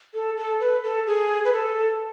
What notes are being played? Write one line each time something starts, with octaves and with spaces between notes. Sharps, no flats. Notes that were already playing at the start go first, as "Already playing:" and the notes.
A4
A4
B4
A4
G#4
B4
A4